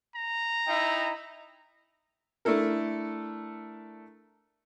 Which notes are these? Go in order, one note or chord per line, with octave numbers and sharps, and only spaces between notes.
A#5
D#4 E4 G5
A3 D4 E4 A4 A#4